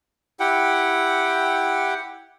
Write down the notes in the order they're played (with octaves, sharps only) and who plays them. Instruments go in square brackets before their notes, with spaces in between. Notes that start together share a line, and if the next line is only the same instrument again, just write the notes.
[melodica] E4 G4 F#5 G5